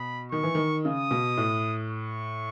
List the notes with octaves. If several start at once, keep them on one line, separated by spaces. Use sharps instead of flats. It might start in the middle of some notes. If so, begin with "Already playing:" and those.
Already playing: B2 B5
D#3 C#6
E3
D#3
C#3 D#6
B2
A2
C#6